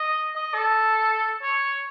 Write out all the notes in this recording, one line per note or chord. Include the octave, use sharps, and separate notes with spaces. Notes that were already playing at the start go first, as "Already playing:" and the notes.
Already playing: D#5
D#5
A4
C#5